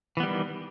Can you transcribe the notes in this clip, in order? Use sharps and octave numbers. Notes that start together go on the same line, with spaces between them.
D#3 E3 G3 B3